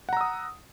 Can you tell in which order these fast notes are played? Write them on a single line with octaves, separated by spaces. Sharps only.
F#5 A#5 E6 D#6